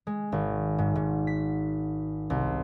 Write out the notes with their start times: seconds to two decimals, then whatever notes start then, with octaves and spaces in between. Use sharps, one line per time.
0.07 G#3
0.32 G#1
0.78 G#2
0.95 G#2
1.27 B6
2.30 C2